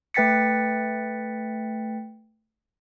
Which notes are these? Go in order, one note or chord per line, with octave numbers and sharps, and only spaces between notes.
A3 B4 G5 A6 B6 C#7